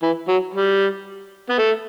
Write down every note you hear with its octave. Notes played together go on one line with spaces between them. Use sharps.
E3
F#3
G3
B3
A3